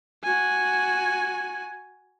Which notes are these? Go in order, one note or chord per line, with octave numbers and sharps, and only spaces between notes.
F#4 G#5